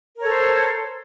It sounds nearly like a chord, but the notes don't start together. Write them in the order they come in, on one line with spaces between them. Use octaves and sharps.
A#4 C#5 A4 C5